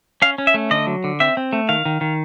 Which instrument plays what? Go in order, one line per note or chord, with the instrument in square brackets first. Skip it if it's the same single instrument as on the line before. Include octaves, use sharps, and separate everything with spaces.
[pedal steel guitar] C#4 F5
C#4
E5
A3
D3 D#5
F#3
D3
C4 E5
C4
A3
D#3 F5
D#3
D#3